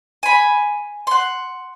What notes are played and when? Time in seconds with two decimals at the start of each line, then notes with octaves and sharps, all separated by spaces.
0.23 G#5 B5
1.07 F#5 C6